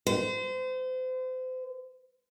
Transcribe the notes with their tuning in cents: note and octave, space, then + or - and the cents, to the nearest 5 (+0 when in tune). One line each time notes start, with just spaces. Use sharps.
C5 -35